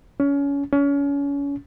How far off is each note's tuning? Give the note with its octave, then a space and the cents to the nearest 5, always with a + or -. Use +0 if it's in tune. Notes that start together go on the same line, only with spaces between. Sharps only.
C#4 +25
C#4 +30